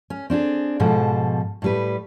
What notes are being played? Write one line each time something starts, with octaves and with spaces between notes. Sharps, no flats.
C#4
C4 D4 F#4 G#4
G#2 B2 F3 A4
A2 G3 B4